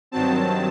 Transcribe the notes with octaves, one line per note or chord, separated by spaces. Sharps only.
G2 D#3 F#3 C4 A5